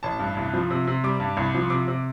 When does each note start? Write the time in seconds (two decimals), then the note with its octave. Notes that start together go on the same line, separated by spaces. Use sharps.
0.03 A1 A5
0.19 G2
0.37 C2
0.54 F3
0.70 C3
0.87 C3
1.04 G3 D6
1.20 G2
1.37 C2
1.54 F3
1.70 C3 D6
1.88 C3